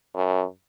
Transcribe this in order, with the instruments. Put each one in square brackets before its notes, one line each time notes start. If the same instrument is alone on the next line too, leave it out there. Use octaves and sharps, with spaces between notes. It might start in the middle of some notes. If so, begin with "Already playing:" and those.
[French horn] F#2